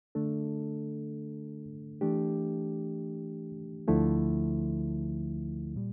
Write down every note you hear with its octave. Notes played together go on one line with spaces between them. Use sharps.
D3 A3 D4 A4
E3 A3 D4 G4
D2 D3 F3 A3 E4
A#2 G3